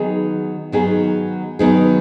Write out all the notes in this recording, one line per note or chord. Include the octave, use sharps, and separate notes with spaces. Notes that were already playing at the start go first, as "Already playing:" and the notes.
Already playing: D#3 F#3 B3 D#4 G#4
D#3 F#3 B3 D#4 G#4
D#3 F#3 B3 D#4 G#4